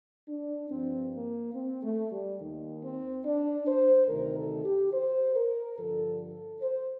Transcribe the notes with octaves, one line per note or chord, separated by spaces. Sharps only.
D4
G2 F3 C4
A#3
C4
A3
G3
D#2 D#3
C4
D4
C5
D2 C3 D#3 A#4
A4
G4
C5
A#4
G2 D3 F3 A4
A4
C5